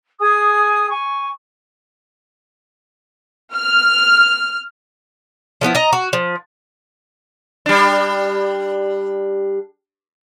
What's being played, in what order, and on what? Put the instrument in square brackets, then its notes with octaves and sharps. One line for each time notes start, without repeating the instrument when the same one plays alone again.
[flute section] G#4 G#5 D#6
G#5 C#6
[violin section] F6
[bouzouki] F3 A3 B3 E4
D#5 A#5
F#4
F3
[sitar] G3 D4